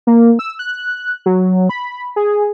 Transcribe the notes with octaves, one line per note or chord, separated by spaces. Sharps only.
A#3
E6
F#6
F#3
B5
G#4